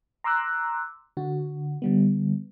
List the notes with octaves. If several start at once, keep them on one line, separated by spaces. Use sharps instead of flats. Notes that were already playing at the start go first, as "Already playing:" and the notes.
A#5 C6 D6 E6 F#6
D3 F#4
D3 G3 B3